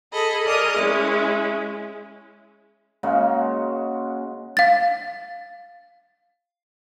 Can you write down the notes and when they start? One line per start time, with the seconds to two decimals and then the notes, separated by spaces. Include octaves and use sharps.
0.13 G#4 A4 D#5 B5
0.46 G#4 A#4 D5 D#5 D#6
0.77 G#3 C#4 E4
3.03 C#3 G#3 A#3 F#4
4.57 F5 A6